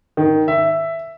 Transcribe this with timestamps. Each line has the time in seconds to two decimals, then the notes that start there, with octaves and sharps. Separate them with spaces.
0.17 D#3
0.48 E5